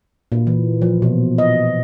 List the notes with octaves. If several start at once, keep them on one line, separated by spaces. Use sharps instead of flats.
A#2
E3
F3
B2
D#5